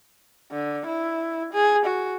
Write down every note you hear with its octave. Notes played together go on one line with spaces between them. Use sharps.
D3
E4
G#4
F#4